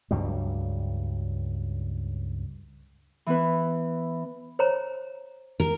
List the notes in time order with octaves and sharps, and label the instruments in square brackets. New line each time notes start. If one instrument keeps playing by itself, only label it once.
[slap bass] C#2 G2 F#3 G3
[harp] E3 B3 B4
[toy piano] C5 C#5 A#5
[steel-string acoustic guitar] A#4